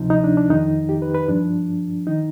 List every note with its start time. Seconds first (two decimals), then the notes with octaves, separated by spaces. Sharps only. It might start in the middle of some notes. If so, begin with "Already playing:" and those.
Already playing: D2 C3 F3 D#4
0.10 D#4
0.24 D4
0.37 D4
0.50 F2 D#3 D#4
0.89 G4
1.02 B4
1.15 B4
1.28 G2 F3 D4
2.07 D#3 D#4